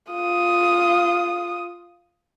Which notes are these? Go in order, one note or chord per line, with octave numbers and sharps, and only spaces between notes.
F4 D#6